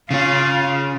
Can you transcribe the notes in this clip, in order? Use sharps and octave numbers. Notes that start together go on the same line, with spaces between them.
C#3 C#4 F4